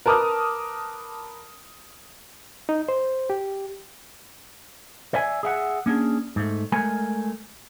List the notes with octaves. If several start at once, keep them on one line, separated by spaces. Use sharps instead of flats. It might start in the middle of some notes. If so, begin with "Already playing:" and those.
A#4 B4 A5 D6 D#6 F6
D#4
C5
G4
D5 E5 G#5
G#4 E5 F#5
A#3 C#4 D4 G#4
G#2 A3
G#3 A3 A#4 G#5